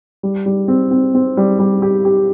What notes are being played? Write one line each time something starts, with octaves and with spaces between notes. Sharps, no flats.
G3
G3
C4
C4
C4
G3
G3
G4
G4